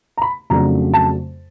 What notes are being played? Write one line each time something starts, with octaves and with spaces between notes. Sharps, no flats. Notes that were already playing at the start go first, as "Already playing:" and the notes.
A#5
B5
F2 C#3 F#3 A3 D4 A#5
A5